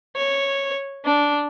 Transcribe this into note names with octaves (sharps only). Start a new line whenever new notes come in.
C#5
D4